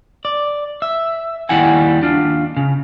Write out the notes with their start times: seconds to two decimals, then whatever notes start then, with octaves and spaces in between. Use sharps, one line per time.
0.25 D5
0.82 E5
1.49 D#2 G3 A3 E4 F#5 G#5
2.02 D#2 D4 F4
2.57 C#3